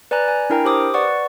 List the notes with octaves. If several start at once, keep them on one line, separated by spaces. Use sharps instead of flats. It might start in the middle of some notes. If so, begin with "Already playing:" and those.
B4 D5 G#5 A#5 F#6
G#5
D4 E4 A#4 G5 A#5
G4 C5 D6 D#6
B4 D5 F#5 C#6